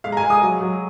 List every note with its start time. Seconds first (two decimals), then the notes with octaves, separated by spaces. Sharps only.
0.04 G#3 F5
0.12 A#5
0.17 G#5
0.23 G#3
0.30 D#6
0.42 F#3
0.61 F#3